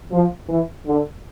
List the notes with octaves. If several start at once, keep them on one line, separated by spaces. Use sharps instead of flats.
F3
E3
D3